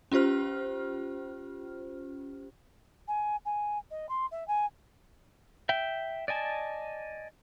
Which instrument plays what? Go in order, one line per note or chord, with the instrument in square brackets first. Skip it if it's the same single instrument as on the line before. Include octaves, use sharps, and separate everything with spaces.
[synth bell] C#4 F4 G4 C5 F6
[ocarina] G#5
G#5
D#5
C6
E5
G#5
[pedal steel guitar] E5 G5
D5 D#5 G#5 A5